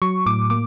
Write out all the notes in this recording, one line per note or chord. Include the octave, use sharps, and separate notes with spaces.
F#3 C#6
A2 D6
A#3 D6